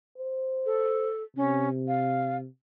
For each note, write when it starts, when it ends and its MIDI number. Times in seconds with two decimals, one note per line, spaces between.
0.18 1.09 72
0.66 1.23 69
1.36 2.47 48
1.36 1.69 61
1.88 2.37 77